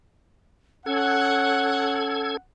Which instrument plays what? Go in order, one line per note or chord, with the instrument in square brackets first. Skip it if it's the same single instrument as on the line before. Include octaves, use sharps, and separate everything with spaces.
[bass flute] C#4 [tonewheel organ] A4 G#6 [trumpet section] F#5